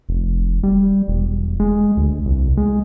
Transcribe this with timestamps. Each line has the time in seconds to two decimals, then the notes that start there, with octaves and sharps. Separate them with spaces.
0.09 F1
0.63 G3
1.08 E1
1.60 G#3
1.97 D2
2.25 C2
2.57 G#3